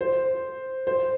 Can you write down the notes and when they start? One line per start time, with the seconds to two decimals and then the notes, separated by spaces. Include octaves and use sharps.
0.01 C5
0.87 C5